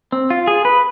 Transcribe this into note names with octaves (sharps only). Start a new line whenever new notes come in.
C4
F4
G#4
B4